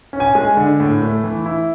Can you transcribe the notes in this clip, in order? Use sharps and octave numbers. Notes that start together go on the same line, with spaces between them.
C#4
G#5
G#3 G#5
D3
A2
A3
E3
E4